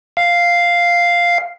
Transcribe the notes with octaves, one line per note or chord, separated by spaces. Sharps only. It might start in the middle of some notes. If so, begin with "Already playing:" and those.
F5